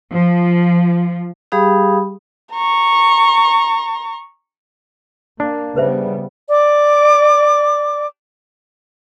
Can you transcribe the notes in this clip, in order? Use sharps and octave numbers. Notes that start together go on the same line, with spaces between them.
F3
G3 G4 G#4 F5 B5 D#6
A#5 C#6
A#3 D4
C#3 G3 B3 B4 C5 E5
D5 D6